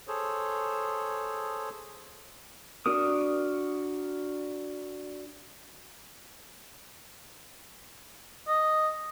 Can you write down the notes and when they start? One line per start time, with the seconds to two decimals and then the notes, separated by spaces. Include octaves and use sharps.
0.08 G#4 A4 C5 C#5
2.86 D4 F#4 A#4 D#6
8.48 D#5